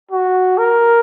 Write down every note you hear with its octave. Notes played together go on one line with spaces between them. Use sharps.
F#4
A#4